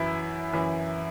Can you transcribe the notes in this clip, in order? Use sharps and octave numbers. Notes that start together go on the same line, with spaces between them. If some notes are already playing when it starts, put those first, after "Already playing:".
Already playing: F#2 E3 E4
F#2 E3